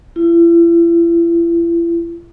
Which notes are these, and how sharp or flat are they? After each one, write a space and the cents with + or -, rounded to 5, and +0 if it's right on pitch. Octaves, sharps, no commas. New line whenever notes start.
E4 +40